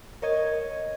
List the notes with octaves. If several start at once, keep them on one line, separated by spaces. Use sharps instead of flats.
A#4 C#5 D#5 G#6